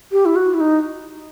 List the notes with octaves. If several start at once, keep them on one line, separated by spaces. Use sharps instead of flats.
G4
E4
F#4
E4
D#4